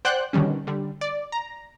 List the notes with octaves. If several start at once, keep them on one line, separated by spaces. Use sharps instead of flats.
C5 D5 F#5 G5 F#6 G6
B2 D3 D#3 G3 C#4
D3 G3
D5
A#5